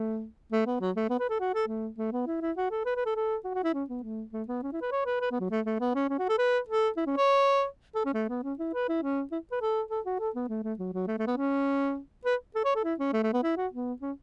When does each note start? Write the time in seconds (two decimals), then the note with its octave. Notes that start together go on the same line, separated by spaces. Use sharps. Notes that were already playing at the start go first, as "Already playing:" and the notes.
Already playing: A3
0.52 A3
0.66 B3
0.80 F#3
0.96 A3
1.09 B3
1.19 B4
1.29 A4
1.40 F#4
1.54 A4
1.68 A3
1.98 A3
2.12 B3
2.27 E4
2.41 E4
2.57 F#4
2.71 A4
2.85 B4
2.96 B4
3.05 A4
3.16 A4
3.44 F#4
3.54 F#4
3.64 E4
3.74 C#4
3.89 B3
4.03 A3
4.33 A3
4.48 B3
4.63 C#4
4.72 E4
4.81 B4
4.92 C#5
5.05 B4
5.21 B4
5.31 B3
5.40 F#3
5.50 A3
5.65 A3
5.80 B3
5.95 C#4
6.09 C#4
6.19 F#4
6.29 A4
6.38 B4
6.68 A4
6.96 E4
7.06 C#4
7.17 C#5
7.95 A4
8.05 C#4
8.14 A3
8.29 B3
8.43 C#4
8.59 E4
8.73 B4
8.88 E4
9.02 C#4
9.32 E4
9.52 B4
9.61 A4
9.90 A4
10.05 F#4
10.19 A4
10.35 B3
10.49 A3
10.63 A3
10.79 F#3
10.93 F#3
11.07 A3
11.18 A3
11.27 B3
11.37 C#4
12.25 B4
12.55 A4
12.64 C#5
12.75 A4
12.84 E4
12.99 C#4
13.13 A3
13.23 A3
13.33 B3
13.43 E4
13.57 F#4
13.73 B3
14.01 C#4